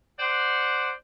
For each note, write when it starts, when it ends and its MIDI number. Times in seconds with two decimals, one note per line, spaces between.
0.19 0.91 72
0.19 0.91 74
0.19 0.91 78